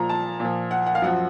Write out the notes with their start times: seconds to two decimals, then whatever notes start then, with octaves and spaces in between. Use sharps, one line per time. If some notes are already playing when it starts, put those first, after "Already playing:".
Already playing: A#2 F3 A#5
0.09 A5
0.40 A#2 F3
0.71 F#5
0.86 F#5
0.95 F5
1.02 F#2 F3 F#5